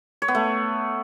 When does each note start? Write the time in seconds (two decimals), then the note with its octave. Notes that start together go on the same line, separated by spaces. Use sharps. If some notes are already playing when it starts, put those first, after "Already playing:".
0.22 C#5
0.28 B3
0.35 A3